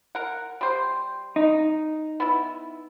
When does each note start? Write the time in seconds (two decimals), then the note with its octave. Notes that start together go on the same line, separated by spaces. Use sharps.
0.15 A#4 F#5
0.61 G3 C5
1.36 D#4
2.20 B3 E4